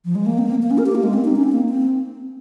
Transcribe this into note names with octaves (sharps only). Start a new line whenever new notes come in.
F3
G#3
A#3
C4
A#3
A#3
C#4
A#4
G4
A#3
G#3
C4
D#4
C#4
C4
A#3
C4